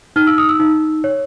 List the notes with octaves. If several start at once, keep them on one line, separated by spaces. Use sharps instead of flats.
D#4 F6
E6
D#6
E6
D#4
C#5